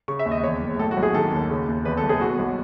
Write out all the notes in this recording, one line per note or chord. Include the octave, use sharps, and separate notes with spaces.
C#3 C#6
E5
D#2
D#5
E2 C#5
F#1
A2 A4
F#4
B1
G#4
D#3 A4
D#2
C#3
D#2
E2 B4
A4
F#1
G#4
B2 F#4
B1